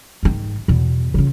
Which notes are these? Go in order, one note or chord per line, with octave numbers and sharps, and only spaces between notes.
G#2 D#3
E2 B2
C#3 F4